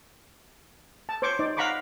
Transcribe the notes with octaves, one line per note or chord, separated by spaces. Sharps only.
A5
C5 C#5 C#6 D6
D#4 C5 D5
F5 F#5 A#5 B5 C#6 D6